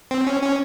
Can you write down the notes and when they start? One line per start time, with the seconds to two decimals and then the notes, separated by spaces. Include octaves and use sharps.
0.11 C4
0.27 C#4
0.42 C#4